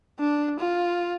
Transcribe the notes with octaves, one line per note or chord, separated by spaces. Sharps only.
D4
F4